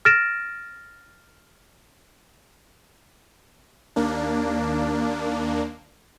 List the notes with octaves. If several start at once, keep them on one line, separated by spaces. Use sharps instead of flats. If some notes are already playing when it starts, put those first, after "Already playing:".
F6 A6 A#6 D7 E7
D#2 A#3 D4